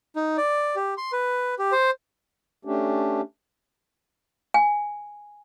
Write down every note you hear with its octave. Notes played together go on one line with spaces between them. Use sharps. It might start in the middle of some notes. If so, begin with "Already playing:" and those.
D#4
D5
G4
C6
B4
G4
C5
A3 C#4 D4 G4
G#5